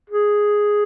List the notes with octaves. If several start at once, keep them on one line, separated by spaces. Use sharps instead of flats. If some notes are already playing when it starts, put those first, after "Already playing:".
G#4